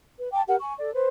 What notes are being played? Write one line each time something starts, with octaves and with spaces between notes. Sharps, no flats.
B4
G5 A5 D6
G4 A#4 F#5
G#5 C#6
A4 D5
B4 C5